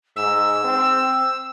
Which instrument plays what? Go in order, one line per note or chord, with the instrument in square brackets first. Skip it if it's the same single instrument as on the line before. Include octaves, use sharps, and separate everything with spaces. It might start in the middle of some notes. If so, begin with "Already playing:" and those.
[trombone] G#2 [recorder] E6
[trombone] C4